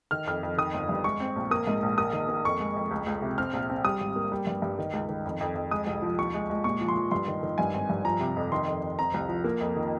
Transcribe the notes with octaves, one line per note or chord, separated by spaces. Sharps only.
D#3 F6
F2 F6
F2
D#3 D#6
G1
G2
G#3 C#6
C4
A#1
A#3 D#6
G#2
A#1
A#3 D#6
D#3
A#3
F2 C#6
G#3
F2
C#2
C#2
C3
C4 F6
A#1
C4
G3 D#6
G#1
A#3
G3
G2
G2
D#3
C#2
D#3
F2
F2
F2
G#3 D#6
C2
F3
D#2 C#6
G#3
G#3
A#2 C#6
F3
C6
F3
G2 C6
D#3
D#3
G2 G#5
G#1
G2
F3 A#5
C3
F2
D#3 C6
F2
F2
C4 A#5
C2
F3
A#3
F2
D#3